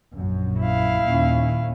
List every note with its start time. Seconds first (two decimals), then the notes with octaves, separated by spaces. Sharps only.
0.14 A#1 F#2
0.60 E4 F5
1.06 D#2 A#2 C#4